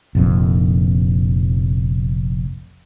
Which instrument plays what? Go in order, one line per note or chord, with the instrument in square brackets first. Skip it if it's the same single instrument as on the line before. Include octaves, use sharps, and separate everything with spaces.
[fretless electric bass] F1 A#1 F2